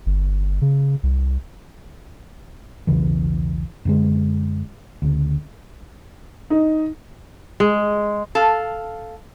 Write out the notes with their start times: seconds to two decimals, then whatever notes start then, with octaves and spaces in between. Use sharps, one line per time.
0.06 G1
0.62 C#3
1.03 C2
2.87 B1 E2 C#3 E3
3.85 F#2 D3 G#3
5.02 D2 C#3
6.50 D#4
7.60 G#3
8.35 A4 F5